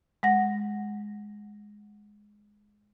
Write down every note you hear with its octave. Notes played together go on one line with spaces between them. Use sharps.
G#3 F#5 A#6